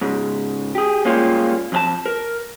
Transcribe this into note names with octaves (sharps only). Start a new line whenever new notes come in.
G#2 C#3
G4 G#4
G3 G#3 A#3 C#4 F4 G4
F2 G#4 A5
A#4